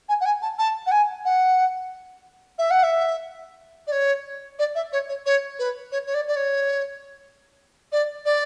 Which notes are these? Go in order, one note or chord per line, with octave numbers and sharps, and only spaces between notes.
G#5
F#5
G#5
A5
A5
F#5
G#5
F#5
E5
F#5
E5
D5
C#5
D5
E5
C#5
C#5
C#5
B4
C#5
C#5
D5
D5
C#5
D5
D5